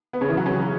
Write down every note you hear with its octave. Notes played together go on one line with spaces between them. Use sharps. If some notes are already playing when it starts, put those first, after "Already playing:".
B3
C#3 C#4
E3 E4
F#3 F#4
C#3 C#4